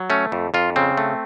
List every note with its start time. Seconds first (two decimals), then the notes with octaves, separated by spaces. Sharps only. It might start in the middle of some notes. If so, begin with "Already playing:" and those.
Already playing: F#3
0.10 A3 C#4
0.32 F2
0.54 F2 F4
0.76 C#3 C4
0.97 A3